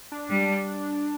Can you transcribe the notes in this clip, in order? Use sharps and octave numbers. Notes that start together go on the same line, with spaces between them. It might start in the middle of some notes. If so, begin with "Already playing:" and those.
D4
G3